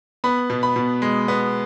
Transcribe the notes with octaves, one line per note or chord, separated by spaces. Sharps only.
B3 B5
B2
B5
B2
G#3
B3